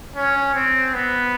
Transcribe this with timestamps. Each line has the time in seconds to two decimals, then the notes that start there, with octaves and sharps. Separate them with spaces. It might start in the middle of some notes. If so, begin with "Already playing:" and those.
0.16 C#4
0.55 C4
0.94 B3